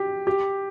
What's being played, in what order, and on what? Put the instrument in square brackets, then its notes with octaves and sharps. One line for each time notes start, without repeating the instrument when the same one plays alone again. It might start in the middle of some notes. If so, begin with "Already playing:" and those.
Already playing: [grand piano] G4
G4